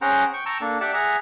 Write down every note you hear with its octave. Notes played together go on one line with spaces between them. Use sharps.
C#4 G#4 C5 F#5 G5 A#5
G5 C#6
G5 A5 A#5 C#6 E6
A#3 D4 A4
G4 D5 E5 F#5 A5
G#4 E5 F#5 A#5